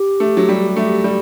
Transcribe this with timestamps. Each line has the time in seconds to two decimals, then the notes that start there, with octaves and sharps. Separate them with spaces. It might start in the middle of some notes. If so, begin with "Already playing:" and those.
Already playing: G4
0.20 A3
0.37 F#3
0.49 G3
0.77 A3
1.04 G3